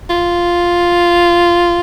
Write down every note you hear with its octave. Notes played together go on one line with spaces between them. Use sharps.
F4